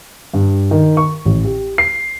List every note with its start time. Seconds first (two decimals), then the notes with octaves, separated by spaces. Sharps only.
0.34 G2
0.71 D#3
0.97 C#6
1.25 A1
1.45 G4
1.78 C7